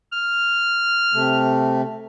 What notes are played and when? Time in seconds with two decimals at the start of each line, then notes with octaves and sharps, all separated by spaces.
0.12 F6
1.13 C3 A3